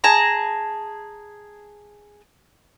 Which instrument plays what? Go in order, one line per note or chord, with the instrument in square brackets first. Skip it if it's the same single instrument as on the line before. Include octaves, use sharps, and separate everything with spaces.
[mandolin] G#4 A5 A#5